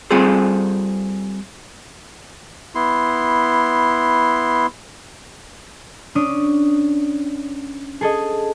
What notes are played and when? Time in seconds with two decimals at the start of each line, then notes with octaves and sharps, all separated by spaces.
0.11 G3 C4 F4 G#4 A4 C5
2.75 B3 E4 C6
6.15 C#4 D4 D#6
8.01 G#4 A4 D#5